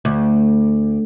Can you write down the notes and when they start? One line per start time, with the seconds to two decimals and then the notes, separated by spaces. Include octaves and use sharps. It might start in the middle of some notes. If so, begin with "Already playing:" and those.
0.05 D2